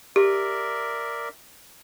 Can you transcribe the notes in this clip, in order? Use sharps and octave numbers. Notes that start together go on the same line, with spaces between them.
G4 A#4 D5 E5